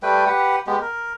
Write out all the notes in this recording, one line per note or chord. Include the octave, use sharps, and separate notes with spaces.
G3 A3 B4 G5
G4 B4 F#5
G#3 B3 G4
A#4